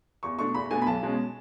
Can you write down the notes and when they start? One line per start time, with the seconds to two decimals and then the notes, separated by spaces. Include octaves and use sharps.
0.23 E2 C#6
0.38 B2 A3 D4 C#6
0.54 E2 B5
0.70 B2 A3 D4 G#5
0.82 B5
0.87 B1 A5
1.03 B2 G#3 C#4